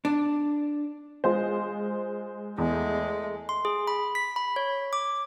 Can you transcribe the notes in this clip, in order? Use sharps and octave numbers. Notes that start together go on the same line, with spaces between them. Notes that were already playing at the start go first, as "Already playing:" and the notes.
D4
G#3 F4 C5
E2 G#3 A3
C6
G#4
B5
B6
B5
C#5
D6